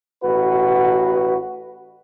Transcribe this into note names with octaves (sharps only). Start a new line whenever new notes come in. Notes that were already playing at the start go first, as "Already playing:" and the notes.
A1 F#4 B4